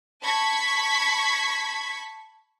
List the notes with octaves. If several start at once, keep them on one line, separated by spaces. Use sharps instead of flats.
A5 B5 C#6 G#6 B6